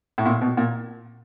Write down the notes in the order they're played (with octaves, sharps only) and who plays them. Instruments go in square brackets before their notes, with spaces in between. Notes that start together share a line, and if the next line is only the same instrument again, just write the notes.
[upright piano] A2
A#2
B2
A#2